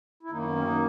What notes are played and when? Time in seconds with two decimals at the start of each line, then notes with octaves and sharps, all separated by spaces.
0.23 E4
0.31 F#2 D#3 A#3 D#4
0.39 C#4
0.48 B3
0.56 C#4
0.64 D#3 D#4